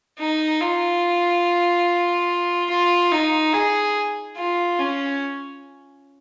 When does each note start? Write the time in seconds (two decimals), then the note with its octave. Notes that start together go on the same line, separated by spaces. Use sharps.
0.19 D#4
0.61 F4
2.70 F4
3.12 D#4
3.53 G#4
4.37 F4
4.79 C#4